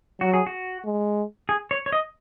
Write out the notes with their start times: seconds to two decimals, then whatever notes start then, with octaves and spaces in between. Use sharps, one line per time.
0.21 F#3 F#4
0.34 G#4
0.46 F#4
0.85 G#3
1.49 G#4
1.71 C#5
1.86 C#5
1.92 D#5